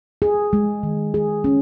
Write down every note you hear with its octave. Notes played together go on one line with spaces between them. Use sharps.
G#4
G#3
D#3
G#4
C#4